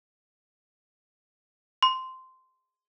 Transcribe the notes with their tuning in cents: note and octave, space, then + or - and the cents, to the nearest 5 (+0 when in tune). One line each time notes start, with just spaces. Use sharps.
C6 -10